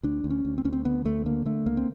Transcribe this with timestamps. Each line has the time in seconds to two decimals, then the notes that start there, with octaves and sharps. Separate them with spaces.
0.03 D2 D4
0.24 D2
0.30 C#4
0.45 D2
0.58 C4
0.65 D2 C#4
0.73 C4
0.85 D3 B3
1.05 D2 A3
1.26 D3 A#3
1.45 D3 A3
1.66 C#2 A#3
1.77 C4